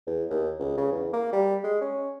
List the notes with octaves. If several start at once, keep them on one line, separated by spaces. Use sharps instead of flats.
E2
D#2
C#2
C#3
E2
A#3
G3
G#3
C#4